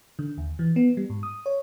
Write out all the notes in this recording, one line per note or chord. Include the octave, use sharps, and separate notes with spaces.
D3
D#2
E3
B3
G3
G#2
D#6
C#5